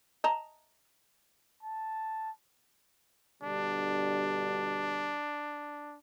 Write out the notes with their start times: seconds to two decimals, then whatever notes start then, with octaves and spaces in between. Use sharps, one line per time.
0.24 D#5 A5 A#5
1.63 A5
3.43 B2 D3 G3 D4